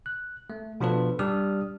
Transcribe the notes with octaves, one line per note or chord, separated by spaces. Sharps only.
F#6
A3
B2 F3 D4 F4 A4 B4
G3 D4 G4 D5 D#6 F6